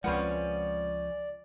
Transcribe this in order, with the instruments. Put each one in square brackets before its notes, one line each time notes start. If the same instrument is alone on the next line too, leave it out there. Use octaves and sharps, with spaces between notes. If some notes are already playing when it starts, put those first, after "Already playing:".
[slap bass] C#2 G#3 [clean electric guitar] F3 C#4 [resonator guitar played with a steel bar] C4 B4 F#5 [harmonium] D5